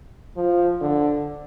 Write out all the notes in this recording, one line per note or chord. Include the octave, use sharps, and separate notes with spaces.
F3
D3